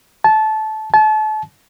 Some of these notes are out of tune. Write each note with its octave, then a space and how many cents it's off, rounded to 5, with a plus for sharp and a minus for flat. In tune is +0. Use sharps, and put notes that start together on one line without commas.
A5 -20
A5 -35